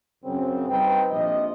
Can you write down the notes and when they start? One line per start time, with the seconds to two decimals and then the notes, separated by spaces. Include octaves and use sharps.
0.24 F#2 C#3 C4
0.69 G3 C4 D#4 B4 G5
1.11 A#1 C3 F3 D#5